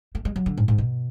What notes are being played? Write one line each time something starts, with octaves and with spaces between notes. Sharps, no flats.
A3
G#3
F#3
D3
G#2
G#2
B2